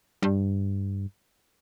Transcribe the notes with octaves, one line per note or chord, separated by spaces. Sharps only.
G2